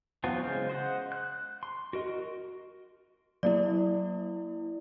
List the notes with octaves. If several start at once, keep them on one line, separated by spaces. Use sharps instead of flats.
E3 F#3 B3 C4 F4
C#3 G#3 C5 F5
C5 D#5 F#5
F#6
C6
F#4 A#4 D#5
F#3 A#3 E4 D5